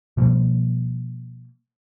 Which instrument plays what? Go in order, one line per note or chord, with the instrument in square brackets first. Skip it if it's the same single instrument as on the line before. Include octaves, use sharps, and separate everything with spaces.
[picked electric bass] B2 F3 G3 A#3